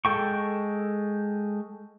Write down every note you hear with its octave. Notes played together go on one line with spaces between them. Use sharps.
G#3 A4 G5 C#6